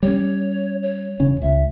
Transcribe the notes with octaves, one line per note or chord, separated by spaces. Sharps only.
G3 C#4 C#5
C#5
E1 C#3 C#4
C#2 E5